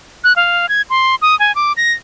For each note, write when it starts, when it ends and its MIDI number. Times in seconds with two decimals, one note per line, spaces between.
0.24 0.36 90
0.36 0.68 77
0.69 0.82 92
0.90 1.15 84
1.22 1.38 87
1.39 1.54 80
1.55 1.73 86
1.77 1.92 94